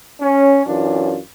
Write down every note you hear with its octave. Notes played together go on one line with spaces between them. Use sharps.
C#4
F#2 E3 D4 F4